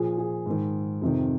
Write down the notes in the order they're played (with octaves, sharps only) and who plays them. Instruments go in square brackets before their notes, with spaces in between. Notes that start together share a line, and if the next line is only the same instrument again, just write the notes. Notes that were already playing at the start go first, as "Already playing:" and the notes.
Already playing: [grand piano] A#2 F3 G#4
G#4
G#2 D#3
F2 C3 D#3